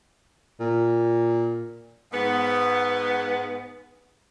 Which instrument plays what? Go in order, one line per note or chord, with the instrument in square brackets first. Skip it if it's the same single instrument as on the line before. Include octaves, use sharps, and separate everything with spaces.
[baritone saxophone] A#2
[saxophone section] G#2 B3